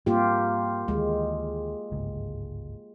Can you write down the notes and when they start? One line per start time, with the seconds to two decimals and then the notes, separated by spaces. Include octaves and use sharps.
0.06 G#2 G3 A#3 C4 F4 G4
0.88 D2 D#3 E3 G#3
1.91 G1 C#2 G#2